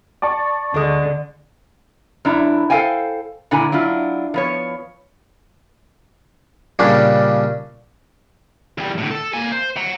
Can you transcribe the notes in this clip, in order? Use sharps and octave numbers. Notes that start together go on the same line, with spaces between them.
D5 A5 C#6
D2 D3 G#3 D4 A4 D#6
F#2 D4 E4 A#5
A4 C5 D#5 F5 G5 G#5
A#2 D3 D4 E4 G#5 A#5
F#3 D4 E4 F4
F3 B3 C#5
A#2 C#3 G3 C#4 D4
E2 G3
A2 D3
A4
A#3 G#5
C5
F#5 A#5